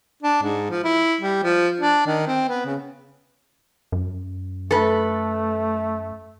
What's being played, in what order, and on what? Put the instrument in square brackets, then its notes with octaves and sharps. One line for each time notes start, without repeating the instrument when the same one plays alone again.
[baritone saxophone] D4
G#2
F3
E4
G3
F3
D4
D#3
C4
B3
C#3
[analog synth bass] F#2
[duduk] A3 [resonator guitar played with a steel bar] A4 B4